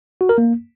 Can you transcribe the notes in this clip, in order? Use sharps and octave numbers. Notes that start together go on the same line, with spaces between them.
F#4
A#4
A#3